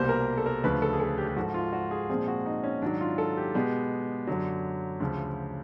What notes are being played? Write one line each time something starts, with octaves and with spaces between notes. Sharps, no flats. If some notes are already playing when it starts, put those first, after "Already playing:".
Already playing: C2 B2 G3 A#3 C5
A#4
A4
A#4
D2 C#3 F3 B4
A4
G#4
A4
G4
G4
G#2 F3 A3 F#4
F4
F#4
G#4
A#2 F3 G#3 C4 G#4
F#4
D#4
C#4
G#2 D#3 F#3 D4
F4
A4
G4
B2 G#3 B3 G4
F#2 D3 F#3
D2 C#3 F3